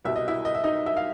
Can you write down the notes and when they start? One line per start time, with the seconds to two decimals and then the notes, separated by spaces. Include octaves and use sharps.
0.05 C2 B2 G3 E5
0.16 D#5
0.28 E4 E5
0.45 D#5
0.55 E5
0.64 D#4 D#5
0.86 E5
0.97 F5